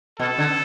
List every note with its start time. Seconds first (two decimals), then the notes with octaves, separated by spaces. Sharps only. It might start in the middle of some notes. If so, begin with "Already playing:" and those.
0.19 B2 A4
0.38 D3